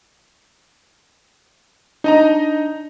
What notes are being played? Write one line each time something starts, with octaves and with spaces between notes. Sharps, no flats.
D4 D#4 D#5 A#5